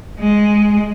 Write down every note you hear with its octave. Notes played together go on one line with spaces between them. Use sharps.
G#3